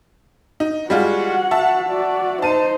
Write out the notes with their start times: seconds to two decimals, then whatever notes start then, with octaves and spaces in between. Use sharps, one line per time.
0.60 D#4
0.90 G3 G#3 F4 F#4 F#5
1.51 E5 A5
1.89 F#4 D5
2.42 D#4 C5 A5 D#7